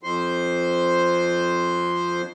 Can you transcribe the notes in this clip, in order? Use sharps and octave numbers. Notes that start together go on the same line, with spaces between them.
F2 C5